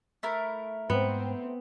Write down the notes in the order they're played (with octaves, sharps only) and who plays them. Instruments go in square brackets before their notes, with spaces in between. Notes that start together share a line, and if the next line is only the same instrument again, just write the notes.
[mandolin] A3 E4 A#4
[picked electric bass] G#2 [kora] B3 [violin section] C4